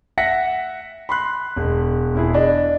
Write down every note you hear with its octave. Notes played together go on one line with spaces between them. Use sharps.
E5 F#5 A#6 B6 C#7
B5 C6 F#6
E1
E1 E4 G#4
D4 D#5